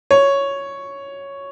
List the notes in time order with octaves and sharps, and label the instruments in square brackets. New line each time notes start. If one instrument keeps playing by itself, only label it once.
[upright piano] C#5